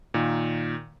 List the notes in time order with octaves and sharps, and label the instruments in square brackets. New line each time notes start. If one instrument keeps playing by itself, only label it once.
[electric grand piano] A#2 D#3